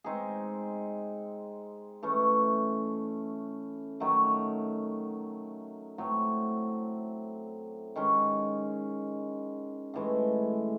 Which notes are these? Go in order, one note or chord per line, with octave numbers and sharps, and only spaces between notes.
G#3 C4 D#4 G#4
E3 A3 C#4
D#3 F#3 A3
A2 F#3 C4
D#3 G#3 C#4
A2 E3 G#3